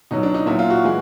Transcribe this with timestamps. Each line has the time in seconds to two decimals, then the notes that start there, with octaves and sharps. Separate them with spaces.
0.11 B2 F#3 D#4
0.23 D4
0.34 D#4
0.46 A#2 F#3 E4
0.59 F4
0.70 F#4
0.84 E3 G#3